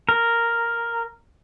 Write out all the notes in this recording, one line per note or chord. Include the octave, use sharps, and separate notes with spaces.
A#4